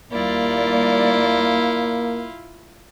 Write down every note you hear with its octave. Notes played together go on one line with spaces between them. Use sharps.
D#2 G3 A#3 E4 F4 D5